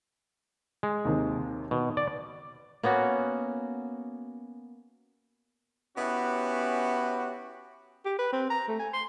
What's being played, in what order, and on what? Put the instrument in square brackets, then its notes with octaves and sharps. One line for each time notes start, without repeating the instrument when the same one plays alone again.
[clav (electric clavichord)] G#3
[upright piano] D#2 C3 D#3
[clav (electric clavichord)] B2 [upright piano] D#3
[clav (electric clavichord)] D5
[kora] A#3 B3 C#4 F#4
[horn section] B3 C#4 E4 F#4 G4
[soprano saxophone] G4
B4
C4
A#5
A3
G#5
C6